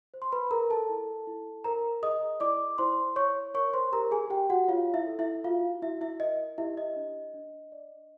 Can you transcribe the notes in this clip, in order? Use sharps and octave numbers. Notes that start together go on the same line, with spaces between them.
C5
C6
B4 B5
G#4 A#4 A#5
A4 A5
E4
E4
A#4 C5 A#5
G#4 D#5 D#6
E4 D5 D6
E4 C5 C6
C#5 C#6
A#4 C#5 C#6
C5 C6
G4 A#4 A#5
G#4 G#5
G4 G5
F#4 F#5
F4 C#5 F5
E4 E5
A4
E4 E5
F4 F#4 F5
E4 F#4 E5
E4 E5
A#4 D#5
E4 G4 E5
D#5
D4
D4
D5